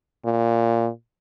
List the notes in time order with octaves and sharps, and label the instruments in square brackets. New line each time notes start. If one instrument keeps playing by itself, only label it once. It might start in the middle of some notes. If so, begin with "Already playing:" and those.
[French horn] A#2